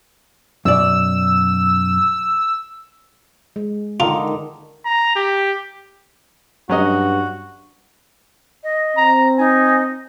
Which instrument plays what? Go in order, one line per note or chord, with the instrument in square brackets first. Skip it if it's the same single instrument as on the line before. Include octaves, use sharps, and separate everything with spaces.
[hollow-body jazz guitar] F#2 B2 D5 [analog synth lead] E6
[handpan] G#3
[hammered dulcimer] D3 D#3 [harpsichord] F4
[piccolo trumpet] A#5
G4
[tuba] G2 [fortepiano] F#3 C#4 D#5 [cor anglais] F#4
[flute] D#5
[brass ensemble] C4 [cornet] A#5
[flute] D#4 [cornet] G#5